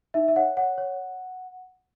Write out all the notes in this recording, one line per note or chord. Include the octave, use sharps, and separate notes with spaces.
D#4 E5
E5
C#5 F#5
C#5 F#5
C#5